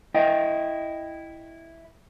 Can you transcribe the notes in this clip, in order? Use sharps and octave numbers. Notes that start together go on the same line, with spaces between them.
E4 D#5 G5